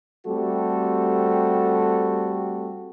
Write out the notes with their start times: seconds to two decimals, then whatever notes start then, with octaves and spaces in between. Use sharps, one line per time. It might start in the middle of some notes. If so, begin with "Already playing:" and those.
0.26 G3 A3 C4 F#4 G4 A4